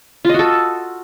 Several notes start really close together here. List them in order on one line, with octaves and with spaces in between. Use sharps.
F4 D#5 F#4 A4